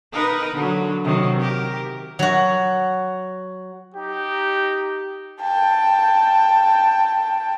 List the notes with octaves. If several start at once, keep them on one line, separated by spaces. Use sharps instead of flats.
D#4 A#4 B4
D3 F#3
C3 D#3 F#3
G4 A#4
F#3 F#4
D#4 G4
G5 A5